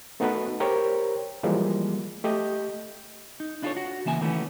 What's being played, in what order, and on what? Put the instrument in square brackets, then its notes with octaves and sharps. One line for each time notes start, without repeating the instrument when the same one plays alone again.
[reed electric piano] A3 B3 D#4 F#4 A4 B4
G4 A#4 C5 C#5 G5
E3 F3 G3 G#3 A#3
A3 G4 D#5 G6
[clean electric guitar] D#4
D4 E4 F4 G#4 A4 C#5
F#4
C#3 E3 A#3 E5 G#5
D#3 E3 A3 B3 C#4